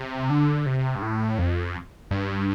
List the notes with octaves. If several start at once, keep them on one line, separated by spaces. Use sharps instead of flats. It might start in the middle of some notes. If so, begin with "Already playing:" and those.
Already playing: C3
D3
C3
G2
A2
F2
G2